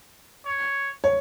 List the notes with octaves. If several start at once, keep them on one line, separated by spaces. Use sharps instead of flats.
C#5
C#5